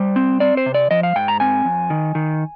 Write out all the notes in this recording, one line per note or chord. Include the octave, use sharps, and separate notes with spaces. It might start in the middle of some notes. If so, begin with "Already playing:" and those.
Already playing: G3 C5
C4
C4 D5
C5
C3
D5
F3 D#5
F5
G#2 G5
A#5
C4 G#5
F2
D#3
D#3